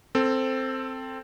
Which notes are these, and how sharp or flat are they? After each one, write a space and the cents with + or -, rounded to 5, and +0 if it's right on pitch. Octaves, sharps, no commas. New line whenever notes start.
C4 +0 A4 +10